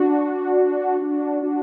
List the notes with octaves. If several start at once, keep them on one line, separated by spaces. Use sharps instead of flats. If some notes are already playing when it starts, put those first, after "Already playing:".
Already playing: D4 F#4
D4 F#4
D4 F#4